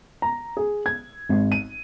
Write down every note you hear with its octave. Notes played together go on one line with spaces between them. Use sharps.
A#5
G#4
G#6
G#1
D#7